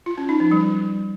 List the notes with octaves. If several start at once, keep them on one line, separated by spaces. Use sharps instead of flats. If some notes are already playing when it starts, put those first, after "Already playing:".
F4
C#4
D#4
F3
G3